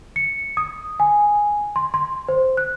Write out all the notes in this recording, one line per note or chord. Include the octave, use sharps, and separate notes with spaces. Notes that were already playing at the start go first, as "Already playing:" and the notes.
C#7
D#6
G#5
C6
C6
C5
F#6